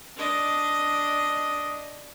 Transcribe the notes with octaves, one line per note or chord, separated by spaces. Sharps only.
D4 D#5